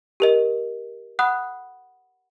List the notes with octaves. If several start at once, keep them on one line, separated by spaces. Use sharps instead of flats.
G4 A#4 D#5
F#5 B5 D#6 F#6